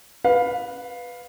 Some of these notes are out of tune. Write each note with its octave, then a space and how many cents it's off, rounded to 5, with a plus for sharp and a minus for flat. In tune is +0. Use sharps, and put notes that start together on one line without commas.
B4 +0 F5 +15